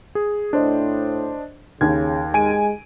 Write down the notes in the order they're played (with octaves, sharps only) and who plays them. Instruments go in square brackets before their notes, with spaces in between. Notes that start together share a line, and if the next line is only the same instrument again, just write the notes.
[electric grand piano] G#4
[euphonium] A2 [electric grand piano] D4 C5 D#5
[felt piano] D#2 [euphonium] C#3 [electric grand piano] G#6
[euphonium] G#3 [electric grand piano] G#5 D7 D#7